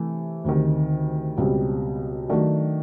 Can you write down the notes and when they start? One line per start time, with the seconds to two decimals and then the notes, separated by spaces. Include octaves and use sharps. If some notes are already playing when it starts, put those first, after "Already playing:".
Already playing: C3 E3 A3
0.44 D2 C3 D#3
1.37 C#2 B2 G3 C4
2.29 D#3 F#3 A3 D4 F#4